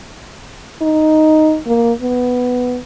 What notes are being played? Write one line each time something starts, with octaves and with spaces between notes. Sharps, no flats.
D#4
A#3
B3